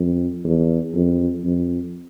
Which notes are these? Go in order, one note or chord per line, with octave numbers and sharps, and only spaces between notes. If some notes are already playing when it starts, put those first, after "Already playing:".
Already playing: F2
E2
F2
F2